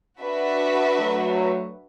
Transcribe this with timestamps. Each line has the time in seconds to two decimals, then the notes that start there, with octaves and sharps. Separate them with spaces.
0.20 D4 F#4 B4 E5
0.98 F#3 A3